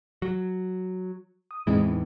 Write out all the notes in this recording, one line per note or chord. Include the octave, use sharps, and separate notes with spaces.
F#3
D#6
E2 A2 E3 G#3 C4 D#4